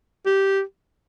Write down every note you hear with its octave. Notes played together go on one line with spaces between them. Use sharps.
G4